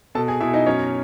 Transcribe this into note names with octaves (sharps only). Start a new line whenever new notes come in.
B2 A4 A5
G#4 G#5
B2 E4 E5
D#4 D#5
F#2 C#4 C#5